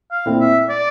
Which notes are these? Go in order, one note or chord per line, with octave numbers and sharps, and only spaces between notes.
F5
A#2 A3 C4 E4
E5
D5